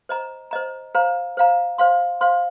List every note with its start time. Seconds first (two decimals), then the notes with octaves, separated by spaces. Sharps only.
0.09 C5 D#5 A#5
0.51 C5 D#5 A#5
0.95 C5 F5 A#5
1.37 C5 F5 A#5
1.78 C5 F5 C6
2.21 C5 F5 C6